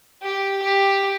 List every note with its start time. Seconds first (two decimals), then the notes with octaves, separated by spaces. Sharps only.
0.23 G4
0.62 G4